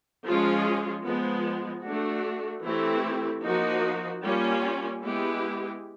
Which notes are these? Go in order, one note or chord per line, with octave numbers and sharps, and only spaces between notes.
F3 G#3 C#4 F4 G#4
F3 G#3 B3
A3 D4 F#4
E3 A3 C4 E4 G4
F3 A#3 D#4 F#4
G3 A#3 C#4 F4
G#3 B3 E4 G4